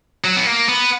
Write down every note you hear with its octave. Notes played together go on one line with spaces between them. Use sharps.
F#3
B3
A#3
B3